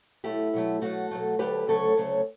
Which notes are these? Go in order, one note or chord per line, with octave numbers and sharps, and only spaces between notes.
B2 F#3 A3 E4 G4
B2 F#3 A3
B2 F#3 A3 F#4 A4
B2 F#3 A3
D2 C#3 F#3 A3 G4 B4
D2 C#3 F#3 A3 A4 C#5
D2 C#3 F#3 A3